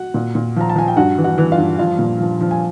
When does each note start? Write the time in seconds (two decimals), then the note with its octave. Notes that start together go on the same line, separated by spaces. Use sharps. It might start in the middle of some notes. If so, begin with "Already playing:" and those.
Already playing: F#4 F#5
0.14 A#2
0.35 A#2
0.56 F3 A#5
0.70 A5
0.76 F3 G#5
0.88 G5
0.96 G2 F#4 F#5
1.18 E3
1.24 F#4 F#5
1.38 E3
1.52 F4 F5
1.58 G2
1.79 F3 F4 F5
1.99 A#2
2.20 F3
2.41 F3
2.51 G#5